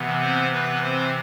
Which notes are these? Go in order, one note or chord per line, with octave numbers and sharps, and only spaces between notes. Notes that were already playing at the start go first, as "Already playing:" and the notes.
Already playing: C3 E3 B3
C4 C5
B3 B4
C4 C5